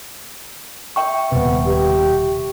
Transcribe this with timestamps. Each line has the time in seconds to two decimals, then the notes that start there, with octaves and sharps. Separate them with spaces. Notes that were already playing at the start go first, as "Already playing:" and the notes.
0.96 E5 G5 C#6
1.32 D#1 C3 B3
1.67 G4